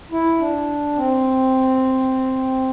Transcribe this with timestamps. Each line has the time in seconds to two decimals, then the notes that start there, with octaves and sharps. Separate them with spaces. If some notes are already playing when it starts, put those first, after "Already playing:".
0.12 E4
0.40 D4
0.96 C4